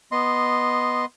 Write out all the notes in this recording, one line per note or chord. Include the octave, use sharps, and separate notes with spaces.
B3 D#5 C6